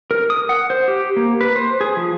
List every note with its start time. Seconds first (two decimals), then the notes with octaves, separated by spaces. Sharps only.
0.11 A#4
0.30 D#6
0.49 F#5
0.70 C5
0.88 G4
1.16 A#3
1.41 B4
1.56 C5
1.81 G#4
1.97 F3